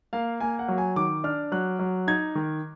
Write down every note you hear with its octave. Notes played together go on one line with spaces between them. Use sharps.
A#3 F5
A#3 G#5
F#5
F#3
G#5
D#3 D6
D4 F6
F#3 F#6
F#3
D#4 G#6
D#3